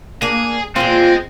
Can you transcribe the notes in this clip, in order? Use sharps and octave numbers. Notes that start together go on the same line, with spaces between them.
A#3 D4 G#4
E2 A#2 G#3 C4 F4